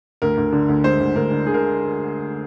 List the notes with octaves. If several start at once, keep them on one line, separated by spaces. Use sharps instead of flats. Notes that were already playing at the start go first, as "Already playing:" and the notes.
D2 A#4
D2
D3
D2
G#3 C5
D2
D2 A#4
D3
D3 G#4
A#4